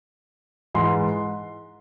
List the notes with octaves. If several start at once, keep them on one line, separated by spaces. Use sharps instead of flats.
G#2 E3 C6